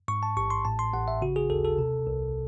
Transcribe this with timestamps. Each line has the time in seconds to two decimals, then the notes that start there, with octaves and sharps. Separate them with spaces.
0.08 G#2 C#6
0.23 A5
0.37 A1 C#6
0.50 C6
0.65 A2 A5
0.79 C6
0.93 A1 F#5
1.08 E5
1.22 C#3 F#4
1.36 G#4
1.50 D#2 A4
1.65 A4
1.78 C3
2.07 C2